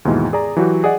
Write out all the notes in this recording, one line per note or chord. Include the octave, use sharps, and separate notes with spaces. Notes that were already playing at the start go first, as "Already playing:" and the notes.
D#2 G#2 B2 E3 G#3
G#4 D5 A#5
E3 F#3 F#4 G4
G#4 D5 D#5 F#5